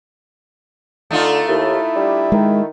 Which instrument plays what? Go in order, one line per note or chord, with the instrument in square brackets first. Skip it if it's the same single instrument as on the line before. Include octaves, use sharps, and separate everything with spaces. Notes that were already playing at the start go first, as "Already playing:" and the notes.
[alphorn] D3 [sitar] A3 D#4 F4
[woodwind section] D#2 [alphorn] E4
[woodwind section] G3 D4
[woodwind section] D#3 [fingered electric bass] G#3